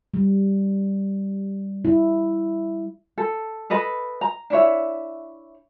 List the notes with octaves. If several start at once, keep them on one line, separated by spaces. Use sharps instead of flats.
G3
E4
A4
A4 B4 D#5 B5
A#5
D4 E4 C#5 E5